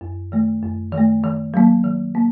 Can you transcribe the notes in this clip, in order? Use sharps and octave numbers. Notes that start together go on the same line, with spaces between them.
F#2
D#3 A3
F#2
D#3
A3
D#3
F#3 A#3
D#3
A#3